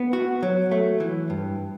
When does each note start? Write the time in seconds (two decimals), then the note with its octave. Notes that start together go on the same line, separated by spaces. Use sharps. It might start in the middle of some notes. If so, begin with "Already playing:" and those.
Already playing: B3
0.13 F#4
0.43 F#3
0.71 A3
1.00 E3
1.30 G2